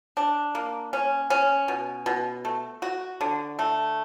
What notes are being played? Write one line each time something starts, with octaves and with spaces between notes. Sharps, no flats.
D4
A#3
C#4
C#4
B2
B2
A3
F#4
D3
A3